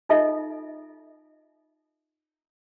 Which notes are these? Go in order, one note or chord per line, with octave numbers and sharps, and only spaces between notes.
D#4 F4 A4 D#5 E5